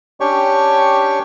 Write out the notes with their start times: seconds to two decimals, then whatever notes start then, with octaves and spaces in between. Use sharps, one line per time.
0.20 C#4 D4 G4 C#5 G5 C#6